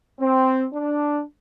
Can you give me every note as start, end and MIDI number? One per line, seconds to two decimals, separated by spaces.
0.20 0.65 60
0.73 1.22 62